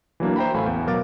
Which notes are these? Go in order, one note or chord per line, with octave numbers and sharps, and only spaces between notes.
E3 F#3 A#3 D4
C5 E5 G5 A#5 B5
A1 A3 F5 G#5 B5
E2
B2 F#3 A#4 F5 D6 A6